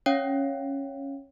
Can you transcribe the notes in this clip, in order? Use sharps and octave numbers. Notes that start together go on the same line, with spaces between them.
C#4 C#5 F5 G5